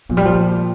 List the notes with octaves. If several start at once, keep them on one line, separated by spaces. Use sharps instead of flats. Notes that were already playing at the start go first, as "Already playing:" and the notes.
A#2 F3
G3
F3